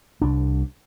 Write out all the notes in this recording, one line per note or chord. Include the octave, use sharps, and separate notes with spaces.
C2 D4